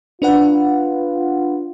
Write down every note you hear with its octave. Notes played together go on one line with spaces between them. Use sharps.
D4 F4 B4 F#5